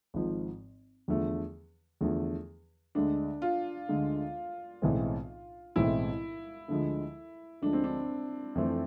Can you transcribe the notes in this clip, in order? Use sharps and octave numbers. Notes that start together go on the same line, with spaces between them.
G#1 G#2 F3
E2 D3 F3 A3
E2 D3 F3 A3
D2 D3 G#3 D4
F4
D2 D3 G#3
B1 A2 E3 G#3 C4
B1 A2 E3 G#3 C4 E4
D2 D3 F3 G#3
D2 D3 F3 G#3 D4
C4
D4
F2 E3 A3 C4